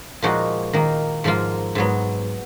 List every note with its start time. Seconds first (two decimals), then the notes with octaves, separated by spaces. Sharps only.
0.22 A#2 F3 G#3 D#4 F#4
0.73 D#3 A#3 D#4
1.24 G#2 F3 A#3 F4
1.75 G#2 F#3 B3